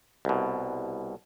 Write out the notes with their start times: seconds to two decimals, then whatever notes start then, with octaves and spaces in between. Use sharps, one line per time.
0.25 C2 B2